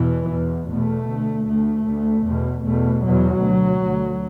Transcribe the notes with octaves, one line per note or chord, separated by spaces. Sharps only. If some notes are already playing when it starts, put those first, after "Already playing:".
Already playing: E2 B2 E3
E2 B2
E2 B2 A3
D2
D2 A3
D2
E2 B2
E2 B2 A3
E2 B2 F#3
D2
D2